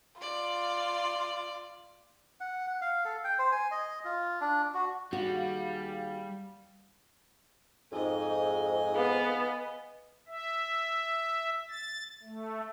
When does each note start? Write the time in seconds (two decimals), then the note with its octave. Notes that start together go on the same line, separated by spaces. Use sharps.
0.21 F4 D5
2.40 F#5
2.67 F#5
2.81 F5
3.05 A4
3.24 G5
3.39 C5
3.52 G#5
3.71 D#5
4.05 F4
4.41 D4
4.74 F#4
5.13 D#2 G3 F#4 G#4 F5
7.92 F2 G#2 D#5 G#5
8.95 B3 F5
10.28 E5
11.70 A6
12.23 A3